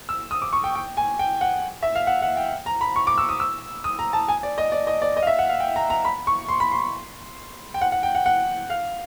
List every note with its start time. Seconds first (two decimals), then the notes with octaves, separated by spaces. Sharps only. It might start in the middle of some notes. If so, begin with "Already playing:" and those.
0.09 E6
0.31 D#6
0.42 D6
0.53 C#6
0.64 G5
0.75 G5
0.97 G#5
1.19 G5
1.41 F#5
1.83 E5
1.95 F5
2.07 F#5
2.22 F#5
2.37 G5
2.66 A#5
2.81 B5
2.96 C#6
3.07 D6
3.18 E6
3.29 D#6
3.40 E6
3.84 D#6
3.99 A#5
4.13 A5
4.28 G#5
4.43 D5
4.58 D#5
4.72 D5
4.87 D#5
5.02 D5
5.16 D#5
5.22 F5
5.27 E5
5.39 F#5
5.49 F5
5.60 G5
5.76 A#5
5.90 A#5
6.05 B5
6.27 C#6
6.49 C6
6.60 B5
6.72 C6
7.74 G5
7.81 F#5
7.92 F#5
8.03 G5
8.15 F#5
8.26 F#5
8.70 F5